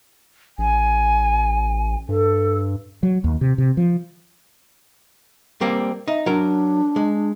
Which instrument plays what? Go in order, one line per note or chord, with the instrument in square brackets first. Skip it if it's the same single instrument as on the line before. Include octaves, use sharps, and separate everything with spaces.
[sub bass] A1 [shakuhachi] G#5
[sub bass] G2 [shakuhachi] A4
[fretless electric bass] F#3
D#2
C3
C3
F3
[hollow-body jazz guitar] G3 A#3 C4
[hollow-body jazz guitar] D#4 [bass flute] E5
[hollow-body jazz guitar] F#3 A#4 [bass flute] D4
[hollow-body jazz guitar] G#3